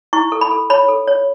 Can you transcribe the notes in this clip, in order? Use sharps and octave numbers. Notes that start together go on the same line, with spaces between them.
E4 C#6
A4
B5
A4
C#5 B5
A4
C#5